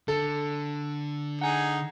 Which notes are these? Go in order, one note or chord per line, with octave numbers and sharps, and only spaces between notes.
D3 A4
D#4 G#4 F#5 G#5